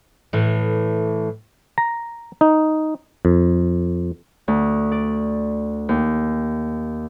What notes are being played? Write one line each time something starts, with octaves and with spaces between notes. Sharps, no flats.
A2 E3
A#5
D#4
F2
D2
D5
D#2